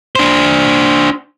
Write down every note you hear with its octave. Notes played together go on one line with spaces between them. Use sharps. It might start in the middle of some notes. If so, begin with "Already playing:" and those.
D4 C5